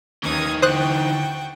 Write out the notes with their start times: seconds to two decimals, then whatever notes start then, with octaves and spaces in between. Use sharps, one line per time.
0.23 D#2 D#3 E3 A#3 C#4 D#4 D#6 G#6
0.62 D3 F#4 C5 G5 D#6 F#6